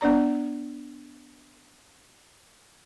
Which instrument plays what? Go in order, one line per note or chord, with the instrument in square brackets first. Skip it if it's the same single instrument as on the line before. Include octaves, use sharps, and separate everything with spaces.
[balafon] B3 D4 D5 A#5